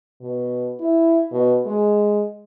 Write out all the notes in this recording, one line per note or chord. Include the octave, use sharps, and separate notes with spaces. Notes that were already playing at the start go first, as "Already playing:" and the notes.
B2
E4
B2
G#3